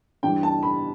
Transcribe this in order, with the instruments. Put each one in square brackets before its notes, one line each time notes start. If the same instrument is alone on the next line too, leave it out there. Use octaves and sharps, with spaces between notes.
[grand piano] G2 E3 G3 G5
A5
B5